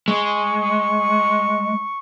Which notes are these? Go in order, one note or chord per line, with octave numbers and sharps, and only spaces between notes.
G#3 C#6